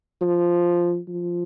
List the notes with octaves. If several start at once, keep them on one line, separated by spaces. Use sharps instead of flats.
F3
F3